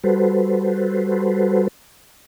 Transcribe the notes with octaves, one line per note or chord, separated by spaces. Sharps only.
G3 F#4 A4 B4 C5